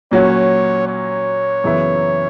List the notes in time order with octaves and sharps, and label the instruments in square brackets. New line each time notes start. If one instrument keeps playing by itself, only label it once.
[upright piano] A#2 F#3 C#4 F#4 [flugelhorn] C#5
[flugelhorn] C#5
[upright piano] F#2 C#3 E3 B3 E4